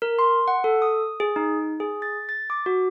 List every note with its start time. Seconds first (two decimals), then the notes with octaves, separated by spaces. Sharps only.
0.02 A#4
0.19 C6
0.48 F#5
0.64 A4
0.82 D#6
1.20 G#4
1.36 D#4
1.80 G#4
2.02 A6
2.29 A6
2.50 D6
2.66 F#4